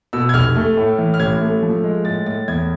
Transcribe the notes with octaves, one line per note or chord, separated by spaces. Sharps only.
B2 E6
G#6
F1 F6
A3
A2
E3
F6
A1 G#6
A3
F3
G#3
A2 A6
A2 A6
E2 G#6